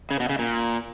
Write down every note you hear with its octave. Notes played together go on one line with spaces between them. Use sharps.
C#3
B2
C#3
A#2